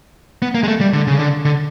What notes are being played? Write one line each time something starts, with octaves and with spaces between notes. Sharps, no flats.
B3
A#3
G#3
A3
G3
D3
C#3
D3
D3